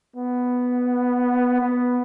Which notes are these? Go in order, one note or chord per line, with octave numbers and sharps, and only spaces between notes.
B3
B3